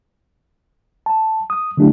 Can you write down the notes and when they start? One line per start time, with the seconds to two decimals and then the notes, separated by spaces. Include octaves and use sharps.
1.06 A5
1.50 D#6
1.77 D3 F#3 A3 D4 E4 G4